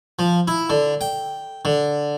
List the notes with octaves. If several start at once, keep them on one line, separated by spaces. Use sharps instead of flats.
F3
E4
D3
G5
D3